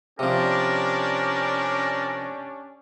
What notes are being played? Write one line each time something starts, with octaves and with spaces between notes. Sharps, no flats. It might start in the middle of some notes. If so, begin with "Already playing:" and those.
C3 F3 C#4 D4 G4 A#4 D5